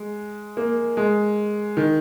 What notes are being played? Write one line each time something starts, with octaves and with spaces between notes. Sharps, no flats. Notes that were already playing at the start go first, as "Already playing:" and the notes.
Already playing: G#3
A#3
G#3
D#3